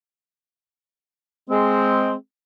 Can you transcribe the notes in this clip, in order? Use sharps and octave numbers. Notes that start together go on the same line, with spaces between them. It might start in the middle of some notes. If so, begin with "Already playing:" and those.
G#3 C4